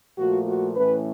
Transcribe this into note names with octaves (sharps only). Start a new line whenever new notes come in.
A#2 F3 A3 F#4
F#4
A2 E3 A3 C#4 B4